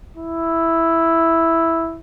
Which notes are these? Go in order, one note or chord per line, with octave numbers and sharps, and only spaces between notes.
E4